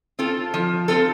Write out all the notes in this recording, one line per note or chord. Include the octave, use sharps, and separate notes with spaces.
C4 F4 A4
F3
C4 F4 A4